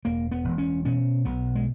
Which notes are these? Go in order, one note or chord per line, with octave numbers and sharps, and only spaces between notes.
E1 A#3
B3
E1
C#4
B2 C#4
B1 B3
G#3